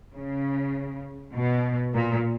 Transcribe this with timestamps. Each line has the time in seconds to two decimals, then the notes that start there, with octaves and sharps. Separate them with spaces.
0.14 C#3
1.34 B2
1.94 A#2